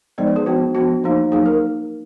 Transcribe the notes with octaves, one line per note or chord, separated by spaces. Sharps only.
F3 G#3 B3 D#4 D5
B4
G#4
F3 B3 D4 F#4
F3 B3 D4 F#4
F3 A#3 D#4
F#3 A#3 D#4 G#4
A#4